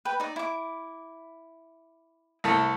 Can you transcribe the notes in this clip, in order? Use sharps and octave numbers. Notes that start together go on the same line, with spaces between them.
B4 G5
D#4 D5
E4 D6
C2 A3 A4